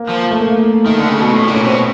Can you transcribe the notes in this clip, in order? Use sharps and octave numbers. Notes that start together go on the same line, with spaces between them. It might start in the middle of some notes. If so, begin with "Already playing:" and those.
Already playing: A#3
F3
A3
A#3
D#3 A3
D3
C#3
B2
A2
A#2
C#4
B2 C4